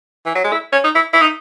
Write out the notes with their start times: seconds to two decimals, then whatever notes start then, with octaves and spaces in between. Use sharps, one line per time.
0.26 E3
0.35 F#3
0.44 G#3
0.52 E4
0.72 C#4
0.84 D#4
0.95 E4
1.13 E4
1.21 D#4